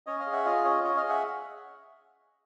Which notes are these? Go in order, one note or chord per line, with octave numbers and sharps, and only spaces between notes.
C#4 C#5 D#5
D#5 F5
G#4
E5 F#5
F4 D#5 F5
C#4 C#5 D#5
C#4 C#5 D#5
D#5 F5
G#4
E5 F#5